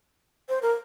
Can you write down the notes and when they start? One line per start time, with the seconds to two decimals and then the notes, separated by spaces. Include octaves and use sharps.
0.49 C5
0.62 A#4